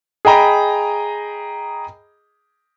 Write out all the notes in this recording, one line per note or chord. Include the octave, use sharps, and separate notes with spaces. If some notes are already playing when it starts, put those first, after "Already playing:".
G#4 D#5 G5 A#5 B5